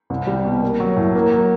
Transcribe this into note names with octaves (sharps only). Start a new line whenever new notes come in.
C2
G3
B2
A#3
F#3
A2
A#3
F#3